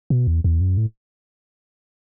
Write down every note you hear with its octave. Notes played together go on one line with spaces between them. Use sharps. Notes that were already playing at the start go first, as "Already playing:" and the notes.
B2
E2
E2
F#2
A2